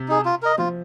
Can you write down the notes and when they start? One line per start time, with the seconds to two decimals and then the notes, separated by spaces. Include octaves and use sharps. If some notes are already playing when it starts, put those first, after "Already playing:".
Already playing: C3
0.08 D#4 G#4
0.25 F4
0.42 A#4 D#5
0.58 F3 F4